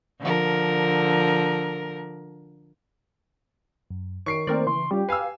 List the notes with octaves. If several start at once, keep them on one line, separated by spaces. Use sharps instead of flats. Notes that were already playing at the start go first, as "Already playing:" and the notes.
D3 F3 A#4
F#2
D#3 C#5 C#6 C7 D7
D#3 A3 A#3 C4 A#4 C5 D5
C#3 E3 C6
G3 C#4 F4 G4
B4 F5 G#5 E6 C7